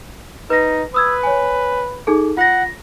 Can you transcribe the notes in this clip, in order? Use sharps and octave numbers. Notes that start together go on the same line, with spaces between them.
D#4 B4 A#6
B4 D#6 E6 G#6
C#5 G#5
D#4 G#4 A4
F4 F#5 A#6